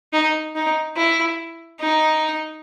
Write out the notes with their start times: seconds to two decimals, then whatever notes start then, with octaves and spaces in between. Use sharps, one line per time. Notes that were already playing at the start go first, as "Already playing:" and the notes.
0.13 D#4
0.55 D#4
0.96 E4
1.80 D#4